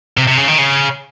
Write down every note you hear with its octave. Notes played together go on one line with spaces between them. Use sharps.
C3
C3
C#3
D#3
C#3